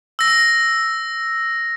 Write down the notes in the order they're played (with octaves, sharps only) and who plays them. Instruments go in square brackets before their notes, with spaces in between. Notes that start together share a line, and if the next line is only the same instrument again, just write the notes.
[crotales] E6 A#6